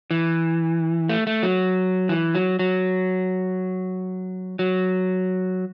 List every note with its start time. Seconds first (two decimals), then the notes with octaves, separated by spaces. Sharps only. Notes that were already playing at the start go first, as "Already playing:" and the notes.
0.11 E3
1.09 A3
1.27 A3
1.43 F#3
2.09 E3
2.35 F#3
2.59 F#3
4.59 F#3